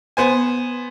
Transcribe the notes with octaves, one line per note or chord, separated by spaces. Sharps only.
B3 C5 G#5